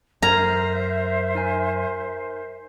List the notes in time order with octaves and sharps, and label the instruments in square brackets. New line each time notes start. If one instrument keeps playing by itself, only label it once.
[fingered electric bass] F#2 [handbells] A#4 F6 G#6 [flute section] C5 E5 [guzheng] A#5
[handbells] D#4 A#4 G#5